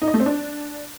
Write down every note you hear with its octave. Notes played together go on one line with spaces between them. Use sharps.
D#4
D#5
A3
C4
D4